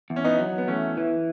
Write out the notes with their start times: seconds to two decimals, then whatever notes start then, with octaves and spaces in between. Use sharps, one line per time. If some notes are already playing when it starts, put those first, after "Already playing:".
0.10 E2
0.16 C#4
0.25 B3 D#4
0.39 F#3
0.58 B3
0.67 E2 A3 C#4
0.97 E3